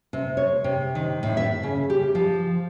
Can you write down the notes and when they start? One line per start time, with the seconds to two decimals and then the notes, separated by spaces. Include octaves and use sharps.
0.13 C3
0.37 C#5
0.64 C3
0.95 D#3
1.23 A2
1.37 E5
1.63 C#3
1.90 G4
2.15 F3